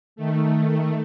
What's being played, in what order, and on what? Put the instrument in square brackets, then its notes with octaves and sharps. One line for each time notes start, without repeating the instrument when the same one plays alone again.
[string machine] D#3 A3